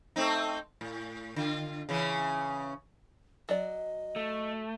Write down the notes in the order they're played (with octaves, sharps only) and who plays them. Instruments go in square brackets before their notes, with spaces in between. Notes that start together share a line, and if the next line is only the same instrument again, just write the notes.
[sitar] A3 C4 D#4
A2
D3 F4
C#3 E3 C#4
[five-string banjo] F#3 D5 [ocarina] D#5
[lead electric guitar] A3